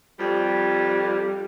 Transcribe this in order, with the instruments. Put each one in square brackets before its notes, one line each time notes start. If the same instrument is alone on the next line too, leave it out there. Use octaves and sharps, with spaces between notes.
[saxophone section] F2 C3 G3